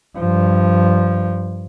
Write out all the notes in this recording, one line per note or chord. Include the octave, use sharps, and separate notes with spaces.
G2 F3